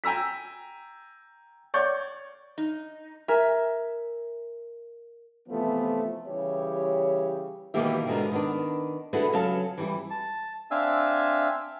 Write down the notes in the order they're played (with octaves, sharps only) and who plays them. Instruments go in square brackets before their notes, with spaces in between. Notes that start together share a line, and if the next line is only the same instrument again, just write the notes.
[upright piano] G5 G#5 A#5 E6 B6
C#5 D5 C#6 G6
[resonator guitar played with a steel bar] D#4
[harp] A#4 G#5 [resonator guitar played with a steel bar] E5
[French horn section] C3 E3 F3 A3 B3 C4
C#3 E3 G3 G4 C#5
[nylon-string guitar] B2 D#3 E3 A#3 G4 E5
G#2 B2 D3 A#4
D#3 B3 D4
D3 E4 F#4 G#4 A4 B4
C#3 F#3 A4 F5 A5
E3 G3 E4
[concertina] A5
C4 D4 E5 F5 G#5 E6